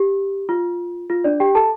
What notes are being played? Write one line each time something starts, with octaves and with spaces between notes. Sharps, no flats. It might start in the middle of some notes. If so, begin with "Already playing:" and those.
Already playing: G4
F4
F4
D4 D5
G4 G5
A4 A5